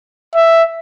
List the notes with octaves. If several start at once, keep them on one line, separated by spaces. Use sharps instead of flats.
E5